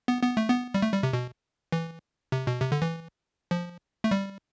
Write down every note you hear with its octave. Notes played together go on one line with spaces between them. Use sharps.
B3
B3
A3
B3
G3
A3
G3
C3
B2
E3
C3
B2
C3
D3
E3
F3
A3
G3